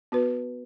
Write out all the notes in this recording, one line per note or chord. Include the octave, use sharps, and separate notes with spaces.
B3 F#4 B4